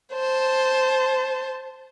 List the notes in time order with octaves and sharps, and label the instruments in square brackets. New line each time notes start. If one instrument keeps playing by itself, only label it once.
[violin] C5 A5